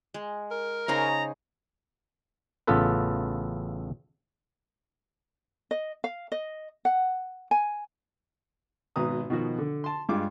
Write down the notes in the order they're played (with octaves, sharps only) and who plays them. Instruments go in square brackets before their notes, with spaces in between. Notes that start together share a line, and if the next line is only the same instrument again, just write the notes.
[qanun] G#3
[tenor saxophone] A#4
[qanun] C#3 C#5 [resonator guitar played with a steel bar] D#4 C5 D#5 [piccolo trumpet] A#5
[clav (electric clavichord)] A1 C#3 B3 F4 A4 B4
[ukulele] D#5
F5
D#5
F#5
G#5
[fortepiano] G#1 B2 B4 A#5 D#6
B2 D#3 F3 F#4
D3
A5 C6
G2 G#3 F4 D6